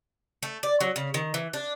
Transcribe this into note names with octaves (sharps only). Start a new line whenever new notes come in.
A3
D5
F#3
C#3
D#3
E3
D4